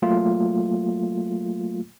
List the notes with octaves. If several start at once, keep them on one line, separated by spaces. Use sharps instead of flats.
F#3 A3 A#3 F4